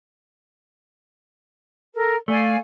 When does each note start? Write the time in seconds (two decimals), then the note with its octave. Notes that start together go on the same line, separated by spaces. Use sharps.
1.94 A4 A#4
2.28 A3 D5 F5 G#5